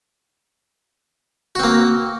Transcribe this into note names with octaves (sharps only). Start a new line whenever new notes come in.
A#3 C4 F#4